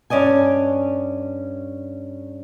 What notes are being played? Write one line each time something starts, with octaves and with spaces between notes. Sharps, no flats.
G2 C#4 D5 D#5 G#5